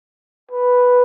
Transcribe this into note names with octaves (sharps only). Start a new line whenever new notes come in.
B4